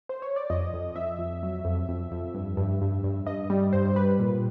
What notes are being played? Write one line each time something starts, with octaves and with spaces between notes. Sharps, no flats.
C5
C#5
D5
F2 D#5
F2
F2 E5
F2
F#3
F2
F2
F2
G2
G2
G2
G2
G2 D#5
G3
G2 C5
G3 B4
A#2